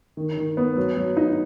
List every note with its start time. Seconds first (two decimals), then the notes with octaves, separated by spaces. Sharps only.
0.17 D#3
0.37 D#3
0.57 B3
0.76 F#3
0.97 F#3
1.17 D#4